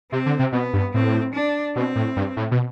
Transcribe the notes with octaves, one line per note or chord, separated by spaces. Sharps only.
C3 C4
D3
C3
B2 B3
G2
A2 C4
D4
B2 C4
A2
G2
A2
B2